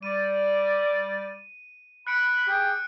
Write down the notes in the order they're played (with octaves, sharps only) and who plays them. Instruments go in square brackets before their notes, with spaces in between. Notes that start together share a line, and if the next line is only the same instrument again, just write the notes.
[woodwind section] G3 D5 [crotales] D#7
[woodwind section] B5 [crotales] F#6 C#7 D7
[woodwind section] G4 G#4 G5